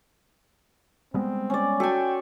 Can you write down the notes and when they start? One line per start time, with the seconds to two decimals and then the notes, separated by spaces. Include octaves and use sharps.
1.14 G3 G#3 B3 C4
1.50 C#4 D5
1.80 F#4 A4 G5 G#5